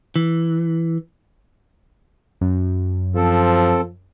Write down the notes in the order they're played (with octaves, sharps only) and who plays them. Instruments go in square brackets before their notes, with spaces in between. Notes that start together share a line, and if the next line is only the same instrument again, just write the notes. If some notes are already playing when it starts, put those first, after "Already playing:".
[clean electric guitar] E3
[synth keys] F#2
[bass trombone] F3 [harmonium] C4 A4